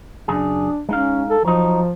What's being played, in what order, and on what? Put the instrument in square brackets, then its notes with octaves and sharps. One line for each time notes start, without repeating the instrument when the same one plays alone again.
[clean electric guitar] F#2 C#3 G#4 [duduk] D4
[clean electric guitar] G#3 D#4 F5 [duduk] C#4
[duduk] A4
[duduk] F3 [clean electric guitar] F#3 D#4